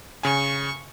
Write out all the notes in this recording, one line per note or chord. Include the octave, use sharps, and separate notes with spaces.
C#3 G#5 C#6